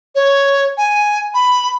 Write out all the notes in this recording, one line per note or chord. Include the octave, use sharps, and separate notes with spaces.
C#5
G#5
B5